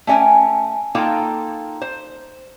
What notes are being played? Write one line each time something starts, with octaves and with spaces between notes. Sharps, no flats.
A3 C#4 D5 G5 G#5
A#3 D#4 F4 A4 G5
C5